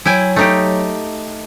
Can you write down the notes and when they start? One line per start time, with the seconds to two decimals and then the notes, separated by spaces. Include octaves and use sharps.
0.05 F#3 E4 G5 G#5
0.36 A3 D#4 G4